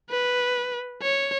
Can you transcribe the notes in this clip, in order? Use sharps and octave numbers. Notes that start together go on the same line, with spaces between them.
B4
C#5